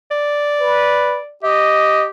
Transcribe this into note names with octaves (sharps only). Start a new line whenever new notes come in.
D5
B4
G4 D#5